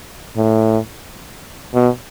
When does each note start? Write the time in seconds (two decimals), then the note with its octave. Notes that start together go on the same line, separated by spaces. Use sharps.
0.37 A2
1.75 B2